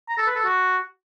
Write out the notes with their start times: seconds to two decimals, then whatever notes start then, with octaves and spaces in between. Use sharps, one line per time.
0.09 A#5
0.18 A4
0.27 B4
0.36 A4
0.44 F#4